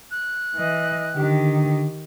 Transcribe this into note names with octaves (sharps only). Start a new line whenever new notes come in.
F#6
E3 D#5
D3 D#3 G4